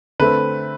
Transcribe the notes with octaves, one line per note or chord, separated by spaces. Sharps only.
D3 A3 C4 B4